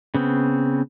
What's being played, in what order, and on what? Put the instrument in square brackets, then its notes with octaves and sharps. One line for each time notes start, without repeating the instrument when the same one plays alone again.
[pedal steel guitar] C#3 B3 C4